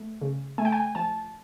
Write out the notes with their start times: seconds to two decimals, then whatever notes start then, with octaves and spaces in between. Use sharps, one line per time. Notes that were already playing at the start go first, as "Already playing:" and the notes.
Already playing: A3
0.22 C#3
0.58 A3 G#5
0.65 G5
0.72 G#5
0.95 F3 A5